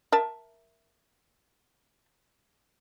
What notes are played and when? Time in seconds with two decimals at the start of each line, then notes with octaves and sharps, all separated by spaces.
0.12 A#4 E5 A5